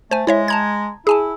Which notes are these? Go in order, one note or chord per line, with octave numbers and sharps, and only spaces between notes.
A3 C5 G#5
G#3 E4 C#5 E5
A5 A#5 G#6
E4 G#4 G#5 A5